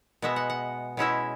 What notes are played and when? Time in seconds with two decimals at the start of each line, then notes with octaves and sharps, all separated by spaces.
0.22 B2 G#3 B3 E5
0.36 F#5
0.50 F#5
0.97 B2 G#3 C#4 E4 E5